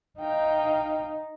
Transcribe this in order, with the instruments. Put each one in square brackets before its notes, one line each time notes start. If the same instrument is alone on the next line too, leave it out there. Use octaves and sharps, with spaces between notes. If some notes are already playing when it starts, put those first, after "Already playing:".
[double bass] D#4 [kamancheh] F5 G5